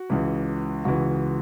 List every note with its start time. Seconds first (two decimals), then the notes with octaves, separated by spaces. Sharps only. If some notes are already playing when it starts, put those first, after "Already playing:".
Already playing: F#4
0.10 C#2 C#3 E3
0.85 C#2 C#3 E3 F#4